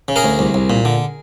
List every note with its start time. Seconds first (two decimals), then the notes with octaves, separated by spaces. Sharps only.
0.08 C#3
0.16 G#4 A#4
0.24 D2
0.39 C2
0.54 C2
0.70 A#2
0.85 D3